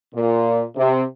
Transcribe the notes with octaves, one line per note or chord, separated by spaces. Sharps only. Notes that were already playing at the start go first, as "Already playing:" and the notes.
A#2
C3